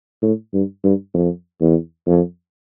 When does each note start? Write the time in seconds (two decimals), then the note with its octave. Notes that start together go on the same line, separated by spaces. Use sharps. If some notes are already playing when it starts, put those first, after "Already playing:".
0.22 A2
0.53 G2
0.84 G2
1.14 F2
1.61 E2
2.07 F2